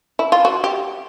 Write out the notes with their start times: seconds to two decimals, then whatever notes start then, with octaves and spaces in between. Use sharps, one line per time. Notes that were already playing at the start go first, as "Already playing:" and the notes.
0.19 E4
0.32 F4
0.45 F#4
0.64 G4